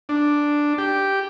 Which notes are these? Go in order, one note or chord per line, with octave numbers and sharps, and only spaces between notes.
D4
G4